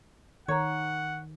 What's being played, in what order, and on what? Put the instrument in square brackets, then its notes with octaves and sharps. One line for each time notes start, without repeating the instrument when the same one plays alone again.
[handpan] D#3 [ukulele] C#5 [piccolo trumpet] F#5 [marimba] A#5 G#6